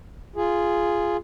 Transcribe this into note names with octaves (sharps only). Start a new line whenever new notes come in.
F4 G#4